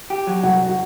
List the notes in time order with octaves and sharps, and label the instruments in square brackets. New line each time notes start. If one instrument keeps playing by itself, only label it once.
[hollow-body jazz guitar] G4
F#3
[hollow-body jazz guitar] C2 [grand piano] F#4
[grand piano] F#4